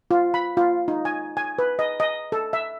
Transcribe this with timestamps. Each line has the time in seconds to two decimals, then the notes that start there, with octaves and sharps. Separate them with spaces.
0.11 F4
0.34 B5
0.57 F4
0.88 D#4
1.05 G#5
1.37 G#5
1.59 B4
1.79 D#5
2.00 D#5
2.32 A4
2.53 E5